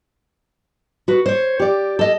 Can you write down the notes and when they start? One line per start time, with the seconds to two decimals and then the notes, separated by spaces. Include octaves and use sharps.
1.08 F#4 B4
1.26 C5 C#5
1.60 G4 D5
1.99 A4 D#5